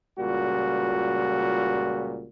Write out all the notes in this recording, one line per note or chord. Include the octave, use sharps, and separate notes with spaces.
C#2 A#2 G3 F#4